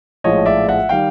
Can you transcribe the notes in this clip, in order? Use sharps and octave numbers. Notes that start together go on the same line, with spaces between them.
A#1 A2 F3 G#3 C#5 D#5
D5 E5
E5 F#5
D#3 G3 F5 G5